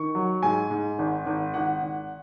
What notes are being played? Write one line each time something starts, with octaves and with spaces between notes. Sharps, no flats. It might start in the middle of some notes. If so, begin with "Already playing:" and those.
Already playing: D#3 C#6
F#3
G#2 G#5
G#2
G#1
G#1
G#1 F#5
G#1